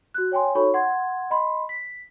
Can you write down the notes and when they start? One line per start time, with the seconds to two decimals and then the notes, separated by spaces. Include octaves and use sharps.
0.14 F#4 F#6
0.32 C#5 G5 G#5 C6
0.55 D#4 F#4 A4 C#5 B5 C#6
0.74 F#5 C6 G#6
1.30 D#5 B5 C6
1.69 B6